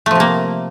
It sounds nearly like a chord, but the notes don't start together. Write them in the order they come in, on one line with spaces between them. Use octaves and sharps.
A3 F3 C3 A#3